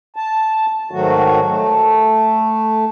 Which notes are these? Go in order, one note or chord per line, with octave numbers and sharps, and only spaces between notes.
A5
G#2 D#3 F#3 A3 F#4
A3